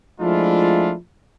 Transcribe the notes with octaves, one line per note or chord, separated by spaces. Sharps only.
F3 G#3 A3 D4 E4 F4